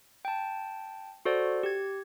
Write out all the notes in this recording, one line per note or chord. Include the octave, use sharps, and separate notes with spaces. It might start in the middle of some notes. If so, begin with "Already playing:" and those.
G5 A5
F#4 A4 C5 D5
G4 G#6